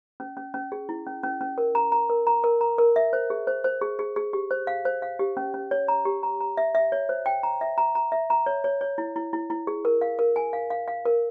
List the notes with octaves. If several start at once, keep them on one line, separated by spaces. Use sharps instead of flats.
C#4
C#4
C#4
G#4
E4
C#4
C#4
C#4
A#4
A#5
A#5
A#4
A#5
A#4
A#5
A#4
E5
C5
G#4
C5
C5
G#4
G#4
G#4
G4
C5
F5
C5
F5
G4
C#4
C#4
C#5
A#5
G4
A#5
A#5
E5
E5
C#5
C5
G5
A#5
E5
A#5
A#5
E5
A#5
C#5
C#5
C#5
E4
E4
E4
E4
G#4
A#4
F5
A#4
G#5
F5
F5
F5
A#4